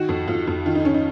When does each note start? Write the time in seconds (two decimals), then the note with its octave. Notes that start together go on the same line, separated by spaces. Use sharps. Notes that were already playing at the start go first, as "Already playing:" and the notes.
Already playing: D#3 F#4
0.09 F2
0.28 F2 F4
0.47 F2
0.66 D#3 F4
0.75 D#4
0.85 D#3 C#4
0.94 D#4